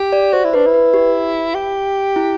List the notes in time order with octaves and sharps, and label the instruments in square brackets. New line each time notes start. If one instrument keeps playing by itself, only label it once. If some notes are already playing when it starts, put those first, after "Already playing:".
Already playing: [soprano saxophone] G4
[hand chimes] D5
[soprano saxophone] F#4 [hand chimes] C5
[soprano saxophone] E4
[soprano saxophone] D4 [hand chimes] B4
[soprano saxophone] E4
[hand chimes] B4
G4
[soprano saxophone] G4
[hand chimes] E4